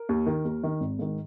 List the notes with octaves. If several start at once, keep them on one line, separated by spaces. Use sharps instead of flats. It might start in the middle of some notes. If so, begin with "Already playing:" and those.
Already playing: A#4
D#2
D#3
D#2
D#3
G#1
G#2 D#3